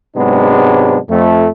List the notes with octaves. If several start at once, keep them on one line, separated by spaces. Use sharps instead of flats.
G#2 C3 F#3 G#3 B3 D4
F2 A3